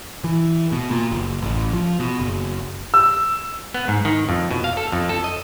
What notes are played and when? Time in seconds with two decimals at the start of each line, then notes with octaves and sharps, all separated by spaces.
0.24 E3
0.72 B2
0.91 A#2
1.11 F#1
1.42 A1
1.73 F3
2.00 B2
2.20 F#1
2.94 E6
3.74 B3
3.88 G#2
4.05 D#3
4.29 F2
4.51 B2
4.64 F5
4.77 A4
4.92 F2
5.09 A4
5.24 D#5